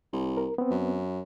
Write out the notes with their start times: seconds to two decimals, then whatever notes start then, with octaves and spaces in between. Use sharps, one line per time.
0.13 C2
0.37 A#4
0.58 B3 C4
0.70 F#2